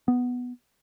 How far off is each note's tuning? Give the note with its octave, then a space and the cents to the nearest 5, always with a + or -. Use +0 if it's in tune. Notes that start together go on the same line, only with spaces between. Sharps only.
B3 +0